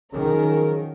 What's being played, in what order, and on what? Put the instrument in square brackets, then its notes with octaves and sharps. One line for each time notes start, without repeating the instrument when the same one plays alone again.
[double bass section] D#3 [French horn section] F3 F#3 G#4 [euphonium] C#4 [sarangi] A#4